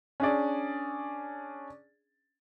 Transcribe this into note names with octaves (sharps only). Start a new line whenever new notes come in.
C#4 D4 G#4 D5